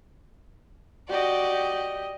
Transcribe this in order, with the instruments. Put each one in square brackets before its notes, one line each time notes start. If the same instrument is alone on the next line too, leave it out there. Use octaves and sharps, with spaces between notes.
[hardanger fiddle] F#4 D5 [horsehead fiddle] G4 D#5